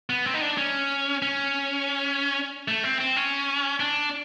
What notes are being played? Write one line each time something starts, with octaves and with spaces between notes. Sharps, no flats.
B3
C4
D#4
D4
C#4
C#4
A3
C4
C4
C#4
D4